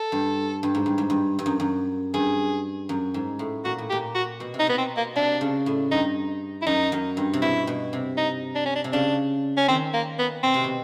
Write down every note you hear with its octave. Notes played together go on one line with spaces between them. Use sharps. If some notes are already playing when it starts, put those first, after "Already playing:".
Already playing: A4
G2
G2
G#2
G2
G#2
G2
G2
F#2
F#2
G2 G#4
F#2
G#2
A2
A#2 F#4
A2
A#2 G4
F#4
B2
C3
D#4
B2 B3
C4
A#3
C3 D4
C#3
A2
G2 D#4
E4
F#2 D#4
F#2
G2
C3
B2 E4
B2
C3
D#4
D4
C#4
D4
C3
C#3 D4
C#4
D#3 C4
A#3
B3
B2 C4
C3
B2